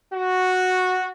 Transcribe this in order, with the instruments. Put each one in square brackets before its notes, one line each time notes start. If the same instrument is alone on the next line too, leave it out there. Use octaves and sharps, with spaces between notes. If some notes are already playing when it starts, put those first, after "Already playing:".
[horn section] F#4